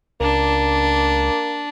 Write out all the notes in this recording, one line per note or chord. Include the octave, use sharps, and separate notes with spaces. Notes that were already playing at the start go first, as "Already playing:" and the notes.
C#2 A#3 D4